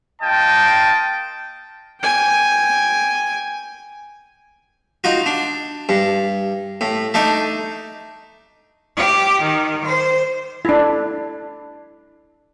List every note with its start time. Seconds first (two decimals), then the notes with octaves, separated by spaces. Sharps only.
0.22 A#3 F4 D#5 G5 A5
2.01 G5 G#5
5.04 D#4 F4 F#4
5.26 D4
5.89 G2
6.81 A2
7.14 A3 D4 D#4
8.96 G4
9.42 D#3
9.85 C5
10.65 D4 E4